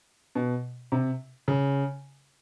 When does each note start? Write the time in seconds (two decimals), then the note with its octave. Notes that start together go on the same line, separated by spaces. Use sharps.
0.35 B2
0.92 C3
1.48 C#3